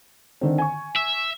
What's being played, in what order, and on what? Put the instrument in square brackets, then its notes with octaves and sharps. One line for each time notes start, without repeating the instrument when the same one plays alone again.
[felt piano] D3 D#3 C4
G#5 C#6
[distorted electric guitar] E5